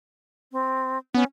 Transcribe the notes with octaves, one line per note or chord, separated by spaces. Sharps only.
C4
B3 C#4